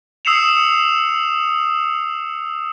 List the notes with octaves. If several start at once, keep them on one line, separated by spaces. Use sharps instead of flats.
D#6 E6 C7 C#7 E7 F7